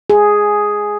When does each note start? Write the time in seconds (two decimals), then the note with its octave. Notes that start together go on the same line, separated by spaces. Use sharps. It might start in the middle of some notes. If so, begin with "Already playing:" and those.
0.10 G#4